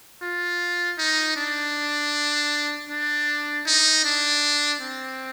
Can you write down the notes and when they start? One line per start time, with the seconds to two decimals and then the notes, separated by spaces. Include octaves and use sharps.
0.22 F4
0.99 D#4
1.36 D4
2.90 D4
3.66 D#4
4.05 D4
4.82 C4